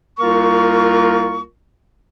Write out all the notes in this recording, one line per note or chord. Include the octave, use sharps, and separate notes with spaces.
C2 A#3 F4 A#4 C#6